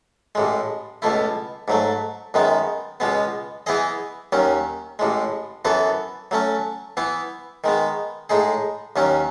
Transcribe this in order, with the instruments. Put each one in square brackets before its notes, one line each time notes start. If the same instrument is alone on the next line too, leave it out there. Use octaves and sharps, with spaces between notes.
[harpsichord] A1 A2 G#3
C#2 B2 A3 E4
G#2 F#3 A3
F#2 D#3 G#3 B3
C#2 B2 G#3 B3
E3 B3 E4 G#4 D#5
D#2 D#3 F#3 C#4
A1 A2 G#3
F#2 E3 B3 F#4 A4
F#3 A3 C#4
E3 B3 E4
D#3 G#3 B3
A2 G#3 D#4 G#4
D#2 D#3 F#3 C#4